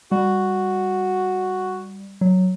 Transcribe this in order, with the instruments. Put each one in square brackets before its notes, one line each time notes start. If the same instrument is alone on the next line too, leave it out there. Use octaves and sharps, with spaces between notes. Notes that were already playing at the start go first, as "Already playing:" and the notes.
[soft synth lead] G3 [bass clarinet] F#4
[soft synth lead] F#3